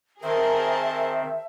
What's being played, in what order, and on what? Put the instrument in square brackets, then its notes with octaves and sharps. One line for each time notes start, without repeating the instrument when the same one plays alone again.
[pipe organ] D#3 C4 [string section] G#4 A#4 [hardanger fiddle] C5 A5 [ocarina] E5